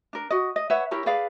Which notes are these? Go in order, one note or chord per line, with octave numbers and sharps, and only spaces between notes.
D4 A#4
F#4 D#5
D#5
B4 C#5 E5 F#5
E4 G4 A#4 C#5
G#4 B4 D5 F5